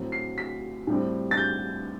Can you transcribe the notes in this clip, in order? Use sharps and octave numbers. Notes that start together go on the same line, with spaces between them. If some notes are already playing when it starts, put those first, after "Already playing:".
Already playing: A2 F#3 C4
C7
B6
A2 G3 C4
A6
G6